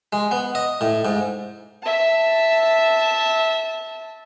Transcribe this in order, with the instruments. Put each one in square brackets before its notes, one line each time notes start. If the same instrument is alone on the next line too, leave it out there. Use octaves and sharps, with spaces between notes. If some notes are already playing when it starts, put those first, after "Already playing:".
[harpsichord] G#3
B3
D#5
A2
G#2
[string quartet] E5 A5